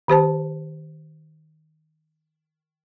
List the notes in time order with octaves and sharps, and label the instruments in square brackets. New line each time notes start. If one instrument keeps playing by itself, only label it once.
[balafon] D#3 G4 C5 A5